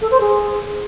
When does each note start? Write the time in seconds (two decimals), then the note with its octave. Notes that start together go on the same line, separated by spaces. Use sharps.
0.01 A4
0.11 C5
0.20 G#4